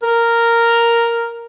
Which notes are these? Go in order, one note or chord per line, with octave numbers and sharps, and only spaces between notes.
A#4